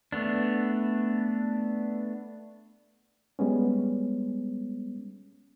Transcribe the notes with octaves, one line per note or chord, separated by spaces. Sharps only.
A3 B3 D4
G3 G#3 B3 C#4